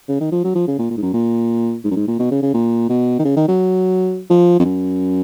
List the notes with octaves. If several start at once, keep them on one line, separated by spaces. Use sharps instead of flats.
C#3
D#3
F3
F#3
F3
C#3
A#2
A#2
G#2
F#2
A#2
G#2
F#2
G#2
A#2
B2
C#3
C#3
A#2
B2
D#3
C#3
D#3
F#3
F3
F2
F#2